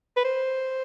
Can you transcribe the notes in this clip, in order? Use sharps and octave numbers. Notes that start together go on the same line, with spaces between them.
B4
C5